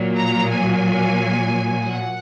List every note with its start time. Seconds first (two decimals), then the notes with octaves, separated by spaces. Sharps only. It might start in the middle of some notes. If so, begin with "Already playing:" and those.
Already playing: A#2 F#3
0.16 A#5
0.50 G#5
1.85 F#5